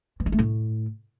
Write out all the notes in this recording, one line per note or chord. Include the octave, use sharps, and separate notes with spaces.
E3
G#3
A3
A2